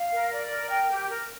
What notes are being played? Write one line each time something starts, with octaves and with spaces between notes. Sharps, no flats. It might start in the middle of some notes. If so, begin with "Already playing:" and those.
Already playing: F5
A#4
D5
A#4
G5
G4
A#4